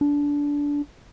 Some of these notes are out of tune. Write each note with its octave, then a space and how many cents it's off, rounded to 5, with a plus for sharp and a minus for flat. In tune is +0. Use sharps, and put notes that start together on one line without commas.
D4 -20